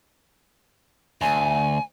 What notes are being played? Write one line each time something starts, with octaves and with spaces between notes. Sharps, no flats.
D2 G#5